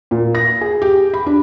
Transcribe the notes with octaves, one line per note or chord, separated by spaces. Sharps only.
A#2
A#6
G#4
G4
B5
D4